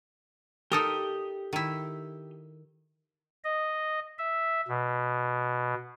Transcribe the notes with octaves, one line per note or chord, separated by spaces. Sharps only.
D#4 G4 A4 A#4 D#6
D#3 E4
D#5
E5
B2